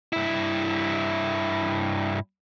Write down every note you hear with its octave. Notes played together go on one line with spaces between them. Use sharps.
G2 E4